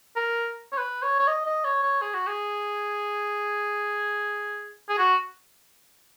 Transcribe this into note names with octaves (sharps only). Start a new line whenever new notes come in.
A#4
C#5
B4
C#5
C#5
D#5
D#5
C#5
C#5
G#4
F#4
G#4
G#4
F#4